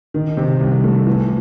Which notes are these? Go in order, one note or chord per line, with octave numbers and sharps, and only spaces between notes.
D#3
C3
C2
A3
E3